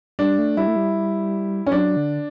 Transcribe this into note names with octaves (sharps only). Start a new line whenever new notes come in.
G3 D4
A3
G3 E4
A3
G3
C#4
F#3 D4
D3